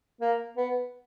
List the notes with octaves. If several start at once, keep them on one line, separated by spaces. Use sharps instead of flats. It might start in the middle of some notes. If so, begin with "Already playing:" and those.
A#3
B3